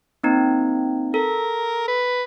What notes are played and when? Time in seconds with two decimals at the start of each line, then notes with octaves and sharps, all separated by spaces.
0.23 A#3 C4 D#4
1.14 A4 A#4
1.88 B4